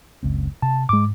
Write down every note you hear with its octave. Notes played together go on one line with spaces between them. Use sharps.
F#1 C#2 C4
C3 A5
G#2 G#3 D6